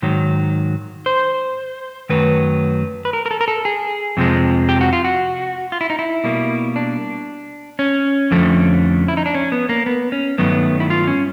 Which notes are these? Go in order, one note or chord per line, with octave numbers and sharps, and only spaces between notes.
G#2 D#3 F#3
C5
F#2 D#3 F#3 A3 B4
B4
A#4
A#4
A4
A#4
A4
G#4
F2 C3 F3 G#3
G4
F#4
F4
F#4
F4
E4
D#4
E4
B2 G3 A#3
D4
C#4
F2 D3 F3 A3
E4
D#4
D4
C#4
B3
A#3
B3
C#4
G2 D#3 F#3 A3 B3
E4
F4
C#4